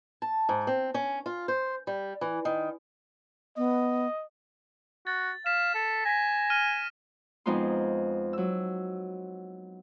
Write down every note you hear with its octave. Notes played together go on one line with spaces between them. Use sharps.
A5
G#2
C4
C#4
F4
C5
G3
E3
D#3
B3 D#5
F#4 A6
F5 B6 E7
A4
G#5 A#6 B6
F6 D#7
F2 G#3 B3 D#4 F4 C6
F#3 E6